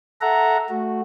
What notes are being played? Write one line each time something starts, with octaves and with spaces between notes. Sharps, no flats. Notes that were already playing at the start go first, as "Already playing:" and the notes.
A4 E5 F#5 A#5
A3 F#4